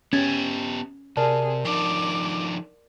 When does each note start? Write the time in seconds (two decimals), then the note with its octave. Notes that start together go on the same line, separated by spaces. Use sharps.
0.13 B3 C#4 G4 G#6 A6
1.17 C3 G#4 A#4 D5 A5
1.65 F3 D4 D#4 D6